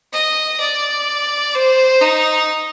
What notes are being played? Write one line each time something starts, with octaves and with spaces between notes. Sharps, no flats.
D#5
D5
C5
D#4